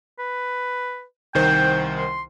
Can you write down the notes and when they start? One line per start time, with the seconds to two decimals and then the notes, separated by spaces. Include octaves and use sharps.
0.19 B4
1.35 C2 D#3 C5 G5
1.98 C6